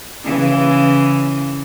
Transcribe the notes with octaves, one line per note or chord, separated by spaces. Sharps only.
C#3 E3